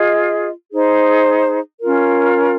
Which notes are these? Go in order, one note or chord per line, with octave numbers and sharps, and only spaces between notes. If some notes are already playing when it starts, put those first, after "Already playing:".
Already playing: F4 G#4 D#5
D#4 G#4 C5
C#4 F4 A#4